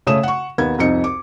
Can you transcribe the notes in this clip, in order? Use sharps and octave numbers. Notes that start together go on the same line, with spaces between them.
C#3 A3 C#4 D#6 E7
F#5 C#6
D#2 B3 G#6
C2 F2 D#4 D#5 C#7
D6